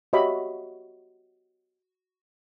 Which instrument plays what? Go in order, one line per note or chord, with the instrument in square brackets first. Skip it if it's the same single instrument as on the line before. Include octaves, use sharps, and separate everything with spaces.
[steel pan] F#4 G4 C#5 D#5 E5 B5